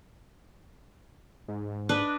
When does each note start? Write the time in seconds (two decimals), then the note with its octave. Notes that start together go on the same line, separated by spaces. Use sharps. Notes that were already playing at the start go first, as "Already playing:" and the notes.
1.48 G#2
1.89 D4 B4 D#5